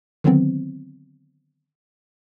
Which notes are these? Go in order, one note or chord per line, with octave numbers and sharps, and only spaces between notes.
D3 D#3 F#3 B3 C4